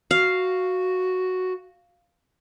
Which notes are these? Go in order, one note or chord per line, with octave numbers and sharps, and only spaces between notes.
F#4 F5